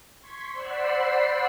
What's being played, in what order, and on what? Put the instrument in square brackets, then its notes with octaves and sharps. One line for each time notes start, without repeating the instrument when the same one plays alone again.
[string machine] C6 C#6 G#6 B6
C5 D5 F#5 B5 E6 C7